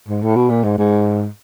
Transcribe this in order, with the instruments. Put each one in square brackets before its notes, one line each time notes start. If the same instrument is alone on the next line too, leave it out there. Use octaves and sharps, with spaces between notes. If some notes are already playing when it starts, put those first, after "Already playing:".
[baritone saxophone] G#2
A2
B2
A#2
G#2
G#2